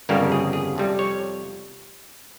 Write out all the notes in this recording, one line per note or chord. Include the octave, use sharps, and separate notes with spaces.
G1 F2 C#3 G3 A#3 A#4
G#4
G#4
F2 C3 G3
C#5